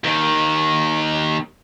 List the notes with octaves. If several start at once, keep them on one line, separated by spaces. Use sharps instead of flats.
D#2 D#3